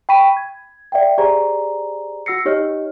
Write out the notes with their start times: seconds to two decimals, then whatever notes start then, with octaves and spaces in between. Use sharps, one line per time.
0.09 G5 B5 C#6 B6 D#7
0.37 G#6
0.92 D5 E5 F#5 G5
1.18 G4 G#4 C5 D5 G#5 A#5
2.26 F#4 F#5 E6 A#6 C7 C#7
2.45 D#4 G4 C#5 D#5 F6